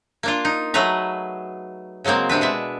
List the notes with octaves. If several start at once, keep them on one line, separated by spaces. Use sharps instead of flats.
A#3 D4 F4
D#4
F#3 A3 G#4 B4 A#5
C#3 F#3 G#3 A#3 C4
C3 C4 D4 B4
B2 G#3 E5